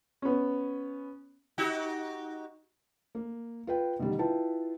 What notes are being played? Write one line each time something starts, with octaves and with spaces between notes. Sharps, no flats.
B3 C#4
D#4 F#4 G4
A#3
F4 B4 G5
B2 D3 D#3 G3
E4 F4 B4 G5 A5